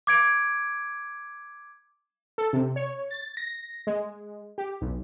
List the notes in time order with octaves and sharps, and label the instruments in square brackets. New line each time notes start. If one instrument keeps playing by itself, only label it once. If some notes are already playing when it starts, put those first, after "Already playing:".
[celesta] D6 G#6 D7
[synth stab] A4
C3
C#5
A6
A#6
G#3
G4
B1